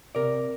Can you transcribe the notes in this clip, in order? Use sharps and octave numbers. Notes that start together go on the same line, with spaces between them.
C3 A#4 D5